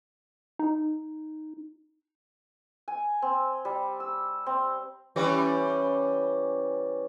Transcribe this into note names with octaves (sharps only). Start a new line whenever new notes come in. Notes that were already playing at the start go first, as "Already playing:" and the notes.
D#4
G#5
C4
G3
E6
C4
E3 G3 C#4